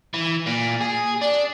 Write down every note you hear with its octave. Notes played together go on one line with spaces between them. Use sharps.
E3
A#2
G#4
D4